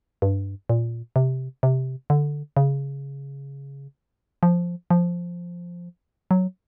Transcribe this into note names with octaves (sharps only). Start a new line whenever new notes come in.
G2
A#2
C3
C3
D3
C#3
F3
F3
F#3